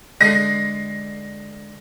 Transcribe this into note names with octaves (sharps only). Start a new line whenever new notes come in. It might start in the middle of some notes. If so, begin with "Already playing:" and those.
D3 G#3 A#6 C7